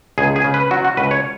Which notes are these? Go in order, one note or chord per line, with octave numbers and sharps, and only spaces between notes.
C#2 G#4
G#4
C#3
B4
F#3 F#4
F#4
C#2 B4
C#5